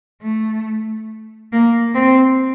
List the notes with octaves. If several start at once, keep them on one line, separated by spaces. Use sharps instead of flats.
A3
A#3
C4